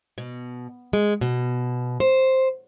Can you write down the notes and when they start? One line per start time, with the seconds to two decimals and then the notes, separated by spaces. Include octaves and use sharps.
0.18 B2
0.93 G#3
1.21 B2
2.00 C5